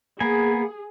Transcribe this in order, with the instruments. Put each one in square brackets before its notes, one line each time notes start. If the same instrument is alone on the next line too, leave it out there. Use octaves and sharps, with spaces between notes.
[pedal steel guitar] A#3 B3 G#5 [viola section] G#4